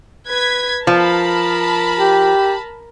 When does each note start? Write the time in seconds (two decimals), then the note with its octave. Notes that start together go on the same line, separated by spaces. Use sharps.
0.28 B4 G#6 B6
0.87 F3 A#4 A5 B5
1.99 G4